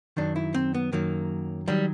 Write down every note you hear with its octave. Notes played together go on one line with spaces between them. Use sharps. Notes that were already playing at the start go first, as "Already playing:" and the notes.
F#2 D#3 F#3 D4
E4
C4
B3
F#2 D#3 F#3 A#3
D#3 F#3 G3